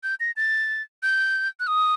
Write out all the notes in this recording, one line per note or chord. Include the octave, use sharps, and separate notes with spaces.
G6
A#6
A6
G6
F#6
D#6